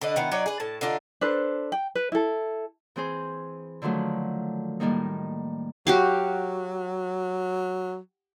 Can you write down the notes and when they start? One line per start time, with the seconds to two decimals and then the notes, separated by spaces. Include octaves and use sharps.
0.01 D3 B4 D#5
0.16 D#3 B3 E4
0.32 F#3 D#4 C#5 D5
0.46 G#4 B4
0.60 A2 A5
0.81 D3 D4 D#4 F4
1.21 D4 A4 B4 C5
1.72 G5
1.95 B4
2.12 E4 A4
2.96 E3 C4 G#4 C5
3.82 D3 D#3 F3 F#3 A3
4.80 A2 D#3 G3 A#3 D#4
5.87 F#3 F#4 G4 F5